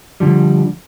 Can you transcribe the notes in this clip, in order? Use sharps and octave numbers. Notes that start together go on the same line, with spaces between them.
D3 F3 G3